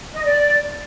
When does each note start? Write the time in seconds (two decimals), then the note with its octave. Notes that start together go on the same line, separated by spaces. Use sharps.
0.13 D#5
0.25 D5